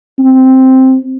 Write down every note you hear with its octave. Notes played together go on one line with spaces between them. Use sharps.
C4